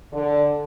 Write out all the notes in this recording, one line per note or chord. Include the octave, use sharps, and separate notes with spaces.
D3